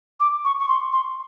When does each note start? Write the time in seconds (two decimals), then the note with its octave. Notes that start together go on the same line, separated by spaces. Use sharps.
0.20 D6
0.45 C#6
0.60 C#6
0.68 C6
0.92 C6